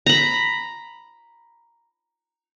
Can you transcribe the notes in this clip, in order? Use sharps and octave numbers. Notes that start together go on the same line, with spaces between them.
A#5 B5